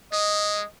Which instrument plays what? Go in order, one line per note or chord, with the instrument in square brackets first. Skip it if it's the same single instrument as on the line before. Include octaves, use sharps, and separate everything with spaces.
[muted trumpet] G#3 [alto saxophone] D#5